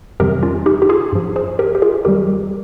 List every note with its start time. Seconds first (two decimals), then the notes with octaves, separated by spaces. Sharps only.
0.20 F2 C3 D#3 G3 G4 A#4
0.43 C#4 F4
0.66 D#4 G4
0.82 G4
0.89 F4 G#4
1.12 G2 F3
1.36 G#4 C5
1.59 G4 A#4
1.75 G4
1.82 F4 G#4
2.05 F2 D#3 G3 G4 A#4